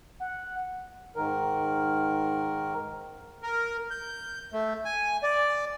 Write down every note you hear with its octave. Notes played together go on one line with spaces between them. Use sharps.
F#5
G#2 D#3 A#4
A#4
G6
A3
G#5
D5